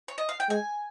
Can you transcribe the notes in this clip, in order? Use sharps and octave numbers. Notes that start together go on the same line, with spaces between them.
C#5
D#5
F5
G5
G#3 G#5